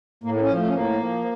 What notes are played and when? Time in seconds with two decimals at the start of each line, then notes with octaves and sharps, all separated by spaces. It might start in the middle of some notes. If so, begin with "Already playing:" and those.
0.24 A2 A#3
0.34 A#3
0.41 C#4
0.49 F3
0.57 A3
0.67 C#4
0.73 A2 A#3
0.98 F3